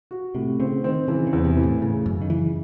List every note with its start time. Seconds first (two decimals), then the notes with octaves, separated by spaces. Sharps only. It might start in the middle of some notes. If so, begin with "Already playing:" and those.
0.11 F#4
0.35 A2 C3
0.60 C#3 C4
0.84 D#3 C4
1.08 C#3 E3
1.27 C#3
1.33 E2
1.45 C3
1.57 E3
1.63 A2
1.81 A2 C#3
2.06 F#2 C#3
2.22 D#3
2.30 C#3 E3